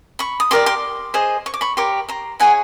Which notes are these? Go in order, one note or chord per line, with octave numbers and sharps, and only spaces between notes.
B5 C#6
D#6
G4 A#4 D5 C6 D6
C6 D6
G#4 C5 D#5
C#6
D6
B5 C#6
G4 A#4 C#5 C6 D6
A#5 C6
E4 G#4 C#5 F#5 G#5